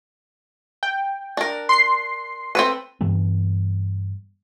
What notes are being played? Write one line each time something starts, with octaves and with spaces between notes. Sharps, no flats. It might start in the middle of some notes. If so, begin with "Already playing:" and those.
G5
D4 A#4
C6 C7
C4 A4 B4
G2 E3 G3 B3